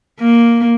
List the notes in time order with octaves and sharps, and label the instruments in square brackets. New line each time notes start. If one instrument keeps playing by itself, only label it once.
[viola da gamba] A#3